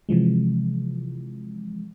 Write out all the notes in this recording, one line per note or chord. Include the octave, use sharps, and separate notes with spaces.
C3 E3 F3 G#3